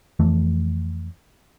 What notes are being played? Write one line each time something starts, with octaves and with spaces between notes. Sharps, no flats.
F2 E3 A3